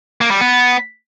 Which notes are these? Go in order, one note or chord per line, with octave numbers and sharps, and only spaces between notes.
A#3
G3
B3